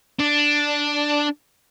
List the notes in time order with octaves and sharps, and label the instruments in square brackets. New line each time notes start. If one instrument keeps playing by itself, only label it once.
[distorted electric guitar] D4